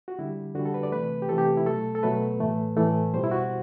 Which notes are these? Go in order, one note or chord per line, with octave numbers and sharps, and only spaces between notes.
F#4
D3 G3 E4
D3 G3 F#4
A4
B4
D5
C3 E3 A3 B4
G4
C3 E3 A3 A4
G4
E4
B2 F#3 A3 A4
A4
B2 F#3 A3 B4
A2 E3 A3
A2 E3 A3
B2 G3 C5
E4
F#4